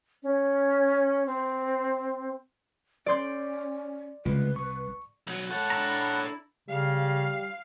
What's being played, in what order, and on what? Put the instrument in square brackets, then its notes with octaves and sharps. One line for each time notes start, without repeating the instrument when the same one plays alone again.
[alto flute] C#4
C4
[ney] C#4 [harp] D5 C6 G6
[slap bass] C2 [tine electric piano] C#3 G#3 F4 [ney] B4
[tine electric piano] C#6
[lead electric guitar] B1 F#3
[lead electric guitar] A4 C#5 [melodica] F#5 A5
[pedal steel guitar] D4 E4 A#5
[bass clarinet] C#3 [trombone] G3 [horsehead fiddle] F5